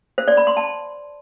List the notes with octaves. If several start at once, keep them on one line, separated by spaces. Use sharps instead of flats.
C5
D5
B5
C6
A5